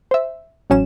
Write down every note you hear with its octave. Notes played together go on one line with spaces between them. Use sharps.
C5 E5
A1 F#3 C#4 E7